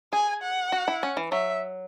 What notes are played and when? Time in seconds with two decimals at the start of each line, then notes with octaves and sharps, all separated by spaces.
0.13 G#4 G#5
0.43 F#5
0.72 F#4
0.88 E4
1.03 C#4
1.17 E3
1.32 F#3 E5